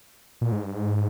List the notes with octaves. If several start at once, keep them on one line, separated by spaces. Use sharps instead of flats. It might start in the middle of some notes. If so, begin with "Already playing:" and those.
A#2
G#2
G2
G#2